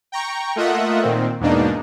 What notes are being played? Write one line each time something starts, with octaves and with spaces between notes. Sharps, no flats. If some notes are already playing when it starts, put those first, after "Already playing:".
G5 A#5 C#6
A3 A#3 F4 D#5 E5 F#5
A#2 D#3 C4
E2 G#2 B2 A#3 D4 D#4